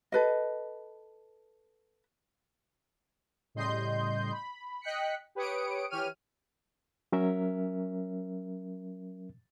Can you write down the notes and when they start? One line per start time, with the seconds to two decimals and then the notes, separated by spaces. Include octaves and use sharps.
0.12 A4 B4 D#5
3.55 A2 C#3 G3 D#5 C6 G6
4.32 B5
4.82 D#5 G5 F#6 B6 C#7
5.35 G4 B4 C#5 D#6 C#7 D7
5.90 E3 G4 C#5 F6 D#7
7.12 F#3 C#4 A#4 E5